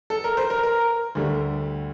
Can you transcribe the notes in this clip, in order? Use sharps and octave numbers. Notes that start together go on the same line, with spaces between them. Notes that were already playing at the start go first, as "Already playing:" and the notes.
A4
A#4
C5
A#4
A#4
D2 D3 G3